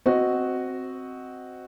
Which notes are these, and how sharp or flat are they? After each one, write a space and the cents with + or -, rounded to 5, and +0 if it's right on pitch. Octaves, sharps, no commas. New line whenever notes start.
C4 +0 F#4 +0 D#5 +0